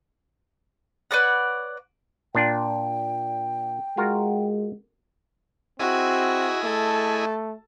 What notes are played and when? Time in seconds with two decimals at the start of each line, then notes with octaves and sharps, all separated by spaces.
1.11 B4 C#5 D5 F#5
2.35 A#2 D4 F4 G5
3.97 G#3 F4 F#4 A#4
5.80 C4 E4 F#4 G#4 D#5
6.64 A3 A4